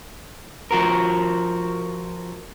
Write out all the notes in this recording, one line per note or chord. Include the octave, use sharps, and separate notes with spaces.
F3 F#4 A#4